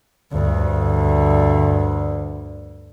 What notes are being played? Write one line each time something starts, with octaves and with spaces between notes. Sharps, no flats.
D2 G2